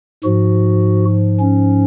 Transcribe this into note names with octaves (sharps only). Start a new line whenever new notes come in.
G#2 F3 F#4
C#4